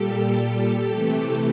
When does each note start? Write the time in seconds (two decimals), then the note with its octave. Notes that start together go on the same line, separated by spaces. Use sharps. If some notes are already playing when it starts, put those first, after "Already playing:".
Already playing: A#2 G3 G4 A4
0.89 C3 E3 A3